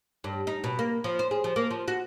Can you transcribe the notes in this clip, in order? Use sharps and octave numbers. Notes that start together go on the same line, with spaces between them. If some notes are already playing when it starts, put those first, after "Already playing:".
G2
D#4
B2
A#3
F3
C5
G#4
F3
A#3
F3
F#4